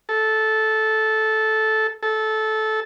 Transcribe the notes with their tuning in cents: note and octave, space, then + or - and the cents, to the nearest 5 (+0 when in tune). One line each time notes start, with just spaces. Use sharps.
A4 -10
A4 -15